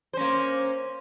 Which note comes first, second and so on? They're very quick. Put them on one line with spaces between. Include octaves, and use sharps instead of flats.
C5 C#4 A#3